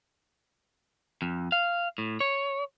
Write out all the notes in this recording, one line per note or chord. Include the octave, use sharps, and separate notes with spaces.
F2
F5
A2
C#5